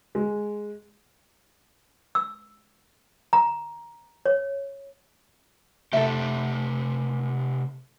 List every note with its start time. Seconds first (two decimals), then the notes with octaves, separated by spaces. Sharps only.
0.15 G#3
2.15 E6
3.33 A#5
4.26 C#5
5.93 C3 A3 G4 A4 E5